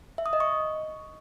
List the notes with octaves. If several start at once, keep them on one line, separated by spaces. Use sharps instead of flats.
E5
D#6
D#5
C#6